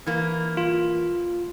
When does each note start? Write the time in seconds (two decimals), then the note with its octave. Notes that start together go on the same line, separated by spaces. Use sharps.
0.06 E3 A#3
0.57 F4